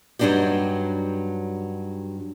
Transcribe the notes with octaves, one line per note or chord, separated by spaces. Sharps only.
G2 F#3 G#3 D4 D#4 G4